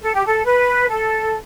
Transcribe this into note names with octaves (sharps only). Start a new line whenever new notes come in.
A4
G4
A4
B4
A4